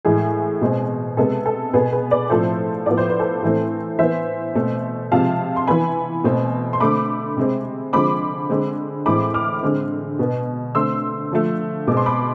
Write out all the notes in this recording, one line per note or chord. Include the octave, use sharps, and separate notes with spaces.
A2 E3 G#3 G#4
B2 G#3 C4
C3 G#3 B3 A4
A4
B2 B3 G#4 B4
G#4 B4
B4 D5
A2 F3 A3 C4 A4 C5
A2 F3 B3 D5
C5
B4
A4 C5
A2 E3 A3 C4
E3 B3 C5 E5
B2 A3 C4
C3 F3 G#3 F5 A5
C6
E3 B3 G#5 B5
B2 A3 C4
C6
D3 A3 C4 B5 D6
C3 G#3 C4
D3 F3 G#3 C4 B5 D6
D3 G#3 C4
A2 E3 G#3 C4 B5 D6
D6 F6
D3 G#3 C4
B2 B3
D3 A3 C4 C6 E6
D3 F3 A3
B2 G#3 C4 D6
C6
B5 D6